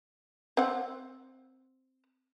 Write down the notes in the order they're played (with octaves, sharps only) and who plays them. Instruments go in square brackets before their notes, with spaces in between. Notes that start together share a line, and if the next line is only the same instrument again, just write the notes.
[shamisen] C4 F#5